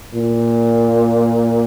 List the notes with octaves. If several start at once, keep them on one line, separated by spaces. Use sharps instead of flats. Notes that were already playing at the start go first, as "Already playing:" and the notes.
A#2